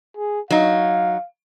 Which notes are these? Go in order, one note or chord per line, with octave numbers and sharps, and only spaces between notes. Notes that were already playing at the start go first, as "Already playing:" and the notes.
G#4
F#3 D#4 F5